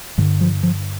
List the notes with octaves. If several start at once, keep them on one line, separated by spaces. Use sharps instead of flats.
G2 D3 E3
F3
F3